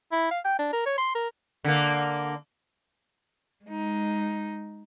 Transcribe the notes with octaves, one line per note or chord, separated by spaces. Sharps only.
E4
F5
G5
D4
A#4
C#5
C6
A#4
D3 A#3
G#3 D#4